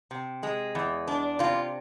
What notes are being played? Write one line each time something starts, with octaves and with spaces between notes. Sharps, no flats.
C3
G#3
E2
D4
C3 F4